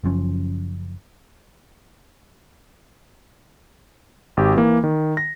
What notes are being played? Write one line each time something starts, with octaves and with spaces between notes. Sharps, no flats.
F#1 F#2 F3 C#4
G#1 G4
E3 A#3
D#3
A#6